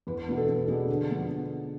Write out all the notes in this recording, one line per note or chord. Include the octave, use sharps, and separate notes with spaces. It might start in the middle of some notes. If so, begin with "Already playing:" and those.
E2 B4
B4
B2 B3 D4 B4
A4
E2 A4
B2 B3 D4 G#4
D3
F3 B3 D4